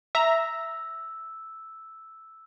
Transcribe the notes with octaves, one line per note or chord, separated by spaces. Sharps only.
E5 A#5 E6